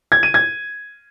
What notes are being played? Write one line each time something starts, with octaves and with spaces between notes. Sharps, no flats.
G#6
D#7
G#6